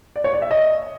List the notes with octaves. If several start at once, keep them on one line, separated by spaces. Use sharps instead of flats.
D5
C#5
D5
E5
D#5